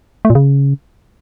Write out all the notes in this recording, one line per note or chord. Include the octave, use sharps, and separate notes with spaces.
A3
A#2
C#3